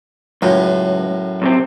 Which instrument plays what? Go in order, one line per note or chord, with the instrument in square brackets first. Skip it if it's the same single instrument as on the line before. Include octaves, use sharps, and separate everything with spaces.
[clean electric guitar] C#2 [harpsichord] F#2 A2
[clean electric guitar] B1 C3 C4